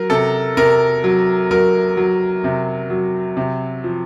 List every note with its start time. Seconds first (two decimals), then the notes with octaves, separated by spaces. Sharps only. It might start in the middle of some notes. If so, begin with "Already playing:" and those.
Already playing: F#3 A#4
0.10 C3 A4
0.57 C3 A#4
1.04 F#3
1.51 F#3 A#4
1.97 F#3
2.44 C3
2.90 F#3
3.37 C3
3.84 F3